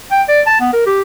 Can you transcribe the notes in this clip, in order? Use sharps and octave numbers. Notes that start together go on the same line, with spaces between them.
G5
D5
A5
B3
A#4
G4